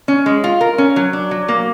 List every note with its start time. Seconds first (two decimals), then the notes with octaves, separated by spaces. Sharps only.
0.08 C#4
0.26 G#3
0.44 F4
0.61 A#4
0.78 C#4
0.96 F#3
1.13 D4
1.31 F#3
1.48 A#3